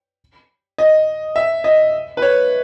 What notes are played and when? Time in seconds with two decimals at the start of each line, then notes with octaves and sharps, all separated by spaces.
0.78 D#5
1.36 E5
1.64 D#5
2.17 B4
2.22 C#5